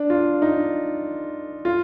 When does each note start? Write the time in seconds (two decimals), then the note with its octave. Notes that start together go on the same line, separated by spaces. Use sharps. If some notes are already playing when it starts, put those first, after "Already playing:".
Already playing: D4
0.10 F4
0.42 D#4
1.65 F4